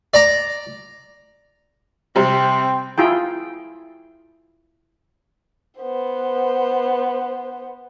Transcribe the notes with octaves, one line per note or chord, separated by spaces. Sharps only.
D5 A#5
C3 G3 C4
E4 F4 G#4 G5
B3 C5